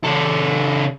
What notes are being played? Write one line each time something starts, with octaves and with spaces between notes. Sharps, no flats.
C#3 A4